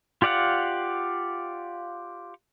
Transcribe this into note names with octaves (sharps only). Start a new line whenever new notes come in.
F4 G4 D5 F5 F#5